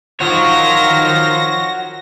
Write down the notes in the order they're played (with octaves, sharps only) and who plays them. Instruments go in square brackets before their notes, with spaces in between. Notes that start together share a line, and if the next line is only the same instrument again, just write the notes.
[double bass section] D#3 [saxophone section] F3 F4 [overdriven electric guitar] F#4 C#5 [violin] A#6